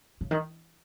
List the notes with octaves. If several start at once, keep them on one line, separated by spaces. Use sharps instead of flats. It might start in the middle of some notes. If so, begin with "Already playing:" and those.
C#3
D#3